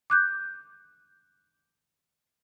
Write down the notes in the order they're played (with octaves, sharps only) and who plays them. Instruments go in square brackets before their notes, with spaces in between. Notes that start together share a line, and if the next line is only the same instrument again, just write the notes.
[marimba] D6 F#6 G6